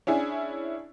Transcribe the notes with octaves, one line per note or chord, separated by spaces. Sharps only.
C#4 D4 E4 G#4